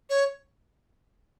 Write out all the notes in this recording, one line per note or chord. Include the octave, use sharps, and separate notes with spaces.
C#5